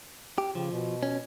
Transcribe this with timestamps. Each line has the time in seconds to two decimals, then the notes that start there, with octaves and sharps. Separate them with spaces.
0.38 G4
0.55 C#3 F3
0.71 B2
1.03 C#4